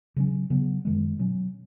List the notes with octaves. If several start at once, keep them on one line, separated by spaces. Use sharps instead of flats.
C#3 F#3 C#4
C#3 F#3 B3
F#2 D#3 G#3
B2 F#3 C#4